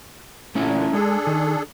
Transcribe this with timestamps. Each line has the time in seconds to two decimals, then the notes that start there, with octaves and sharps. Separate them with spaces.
0.55 A#2 D3 A3 C#4 E4
0.93 G#3 D4 G#4 A4
1.27 D#3